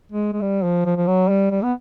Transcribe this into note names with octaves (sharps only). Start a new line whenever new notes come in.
G#3
G#3
G3
F3
F3
F3
F#3
G3
G3
B3